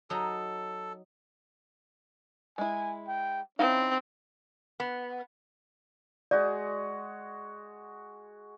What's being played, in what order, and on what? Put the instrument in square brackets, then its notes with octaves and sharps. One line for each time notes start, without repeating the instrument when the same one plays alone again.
[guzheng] F#3 D#4 A#5 [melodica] A4
[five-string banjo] G#3 E4 [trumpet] G#5
[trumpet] G5
[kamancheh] C4 [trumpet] C#4 [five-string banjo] D#4 E4 F5
[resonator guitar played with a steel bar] B3
[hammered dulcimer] G#3 F#4 G#4 [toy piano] D5